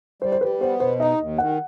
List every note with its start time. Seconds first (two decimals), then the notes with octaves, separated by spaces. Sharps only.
0.22 G3 C5
0.32 C5
0.41 G3 B4
0.61 B3 C5
0.80 B2 C5
1.00 D#4 D#5
1.20 D#2
1.38 D#3 F#5